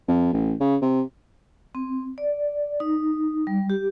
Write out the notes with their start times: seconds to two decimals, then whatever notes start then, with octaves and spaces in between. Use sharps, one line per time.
0.08 F2
0.33 A1
0.61 C#3
0.82 C3
1.75 C4
2.18 D5
2.80 D#4
3.47 G3
3.70 G4